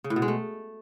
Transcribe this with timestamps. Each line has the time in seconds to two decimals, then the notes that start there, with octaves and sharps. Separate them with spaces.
0.04 C#3
0.10 A2
0.16 B2
0.22 G#3
0.28 A3